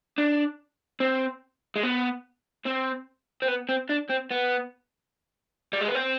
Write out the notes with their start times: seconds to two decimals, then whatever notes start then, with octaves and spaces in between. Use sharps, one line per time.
0.18 D4
1.00 C4
1.76 G#3
1.83 B3
2.65 C4
3.42 C4
3.48 B3
3.69 C4
3.89 D4
4.09 C4
4.31 B3
5.73 G3
5.81 G#3
5.88 B3
5.95 C4